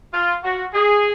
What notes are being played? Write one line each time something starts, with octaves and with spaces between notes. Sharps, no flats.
F4
F#4
G#4